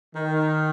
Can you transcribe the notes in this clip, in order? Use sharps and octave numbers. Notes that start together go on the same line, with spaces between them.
D#3